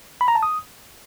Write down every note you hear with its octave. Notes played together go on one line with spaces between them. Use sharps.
B5
A#5
A5
D#6